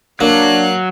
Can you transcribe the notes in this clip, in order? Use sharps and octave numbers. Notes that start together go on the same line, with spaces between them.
F#3 A#3 D4 F5 F#6